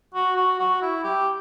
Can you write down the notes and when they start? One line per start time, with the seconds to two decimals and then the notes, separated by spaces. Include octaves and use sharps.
0.15 F#4
0.36 F#4
0.60 F#4
0.82 E4
1.04 G4